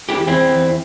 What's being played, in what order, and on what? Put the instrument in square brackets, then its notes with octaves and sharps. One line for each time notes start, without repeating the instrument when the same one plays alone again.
[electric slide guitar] E4 G4
E2
C4 E4
E2